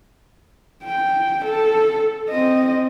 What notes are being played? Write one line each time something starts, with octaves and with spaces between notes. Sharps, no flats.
G5
A4
C4 D#5